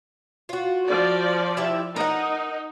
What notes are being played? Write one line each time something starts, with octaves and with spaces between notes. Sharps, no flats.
F4 F#4
F3 D5
E4 G4 E5
D#4 A#4 F#5